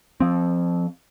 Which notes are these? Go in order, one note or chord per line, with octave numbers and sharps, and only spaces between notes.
F3 C4